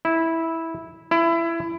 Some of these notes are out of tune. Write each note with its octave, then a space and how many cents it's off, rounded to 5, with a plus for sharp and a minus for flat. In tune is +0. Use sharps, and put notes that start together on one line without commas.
E4 -10
E4 +20